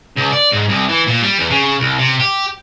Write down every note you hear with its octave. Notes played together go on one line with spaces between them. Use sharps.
C#2
D5
G#2
C2
E3
A#2
G3
E2
C#3
C2
C3
G4